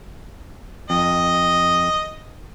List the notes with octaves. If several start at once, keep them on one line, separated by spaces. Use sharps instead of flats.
F2 D#5